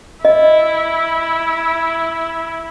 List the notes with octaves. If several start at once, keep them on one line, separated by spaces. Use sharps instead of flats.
E4 D#5